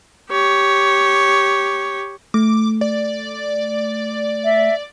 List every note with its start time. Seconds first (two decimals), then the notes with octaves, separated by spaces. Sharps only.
0.30 G4 C#5
2.34 A3 D6
2.81 D5
4.45 E5